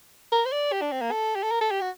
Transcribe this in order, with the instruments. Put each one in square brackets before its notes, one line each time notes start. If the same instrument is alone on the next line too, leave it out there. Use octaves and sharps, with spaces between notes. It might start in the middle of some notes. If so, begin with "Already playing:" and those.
[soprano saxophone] A#4
C5
D5
G4
D4
C4
A#3
A4
G4
A4
A#4
A4
G4
F#4